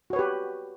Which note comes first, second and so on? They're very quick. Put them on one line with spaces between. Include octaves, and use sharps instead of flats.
F#4 C#5 B4 G4